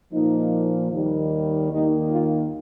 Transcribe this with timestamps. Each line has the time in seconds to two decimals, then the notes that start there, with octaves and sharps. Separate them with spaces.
0.13 A#2 F3 A#3 D#4
0.92 D#2 D#3 G3
1.72 D#2 D#3 A#3 D#4
2.11 F4